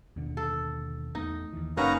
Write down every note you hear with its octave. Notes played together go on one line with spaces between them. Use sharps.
D#2 B2 D3
A4
E2 A3 B3 D#4
D#2 E3
F#1 A#3 C#4 D#4 B4 F#5 A#5